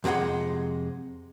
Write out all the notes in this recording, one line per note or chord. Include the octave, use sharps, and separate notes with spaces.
F2 C3 G#3 F#5 C6